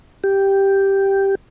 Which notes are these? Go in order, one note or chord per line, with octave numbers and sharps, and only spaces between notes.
G4